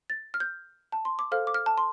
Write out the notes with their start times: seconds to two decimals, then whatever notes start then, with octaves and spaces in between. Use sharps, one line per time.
0.10 A6
0.34 F6
0.40 G6
0.92 A5
1.05 C6
1.19 D6
1.32 A4 C5 F5 F6
1.47 D6
1.54 F6
1.66 A5
1.78 C6